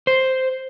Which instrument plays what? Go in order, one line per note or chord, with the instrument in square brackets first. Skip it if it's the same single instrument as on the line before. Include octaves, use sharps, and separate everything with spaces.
[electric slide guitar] C5